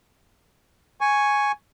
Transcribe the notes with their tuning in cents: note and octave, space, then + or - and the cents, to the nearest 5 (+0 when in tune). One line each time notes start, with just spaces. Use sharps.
G#5 +0 C#6 +0